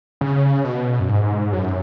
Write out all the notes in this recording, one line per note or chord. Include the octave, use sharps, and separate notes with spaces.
C#3
B2
F#2
G#2
F#2